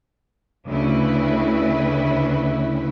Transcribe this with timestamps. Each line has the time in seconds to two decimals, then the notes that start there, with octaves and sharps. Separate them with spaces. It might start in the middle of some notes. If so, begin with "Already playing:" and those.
0.66 D2 C#3 E4 B4